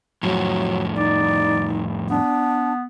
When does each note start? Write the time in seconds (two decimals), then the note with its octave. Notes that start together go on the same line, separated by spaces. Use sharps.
0.23 F2 A2 F#3
0.97 D#4 D5
2.09 B3 D4